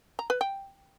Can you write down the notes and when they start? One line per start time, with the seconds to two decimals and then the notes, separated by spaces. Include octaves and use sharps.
0.19 A#5
0.30 B4
0.41 G5